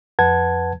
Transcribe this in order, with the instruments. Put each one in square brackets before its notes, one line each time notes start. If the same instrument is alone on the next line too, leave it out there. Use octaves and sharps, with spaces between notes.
[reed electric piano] F2 B4 F#5 A5 G#6